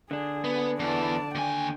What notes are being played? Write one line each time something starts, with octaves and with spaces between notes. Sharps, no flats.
D3 D4 G#4
B3
E2 E3 D5 A5
D#2 G5 G#5